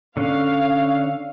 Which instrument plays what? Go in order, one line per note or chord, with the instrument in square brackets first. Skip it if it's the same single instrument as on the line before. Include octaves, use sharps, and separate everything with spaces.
[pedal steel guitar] D3 C#4 [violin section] F5